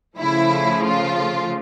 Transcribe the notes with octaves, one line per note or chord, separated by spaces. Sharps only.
C#3 F3 A3 E4
F4